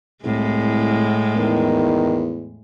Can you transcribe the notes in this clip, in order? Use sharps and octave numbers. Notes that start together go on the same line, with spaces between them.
C2 A2 G#3
E2 D#3